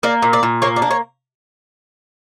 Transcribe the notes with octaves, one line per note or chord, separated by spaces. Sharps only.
A#3 D5
A#2
D5
A#2
A#3 C#5
D5
D4
C#5